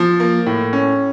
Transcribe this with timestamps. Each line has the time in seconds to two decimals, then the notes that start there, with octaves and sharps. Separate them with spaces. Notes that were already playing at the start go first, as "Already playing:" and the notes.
Already playing: F3
0.20 A#3
0.46 A2
0.73 C#4